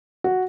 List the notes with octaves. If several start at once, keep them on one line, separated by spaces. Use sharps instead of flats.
F#4